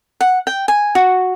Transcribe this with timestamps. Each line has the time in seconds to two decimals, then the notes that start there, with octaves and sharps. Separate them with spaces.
0.21 F#5
0.47 G5
0.68 G#5
0.95 F#4